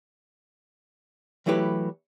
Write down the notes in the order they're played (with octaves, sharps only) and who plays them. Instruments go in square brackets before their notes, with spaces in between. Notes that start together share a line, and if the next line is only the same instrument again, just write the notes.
[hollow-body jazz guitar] E3 F#3 A3 E4 G4 B4